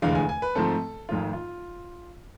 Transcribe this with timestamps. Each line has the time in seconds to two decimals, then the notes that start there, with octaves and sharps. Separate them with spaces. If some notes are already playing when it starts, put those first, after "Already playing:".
0.02 F1 E2 D3 G#3 F5
0.15 G#5
0.29 G#5
0.42 B4
0.55 G#2 F3 A3 C4 A4
1.09 G#1 G#2 F3 A3 F4
1.33 F4